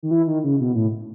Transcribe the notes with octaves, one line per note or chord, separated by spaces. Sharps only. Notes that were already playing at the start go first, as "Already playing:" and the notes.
D#3
E3
D#3
C#3
B2
A2